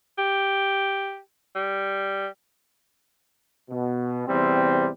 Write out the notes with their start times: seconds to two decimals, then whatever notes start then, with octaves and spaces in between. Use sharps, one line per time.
0.18 G4
1.55 G3
3.70 B2
4.27 E2 C3 G3 C4